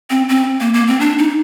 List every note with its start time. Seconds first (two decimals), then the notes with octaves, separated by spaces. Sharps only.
0.10 C4
0.29 C4
0.60 A#3
0.74 A#3
0.88 C4
1.00 D4
1.18 D#4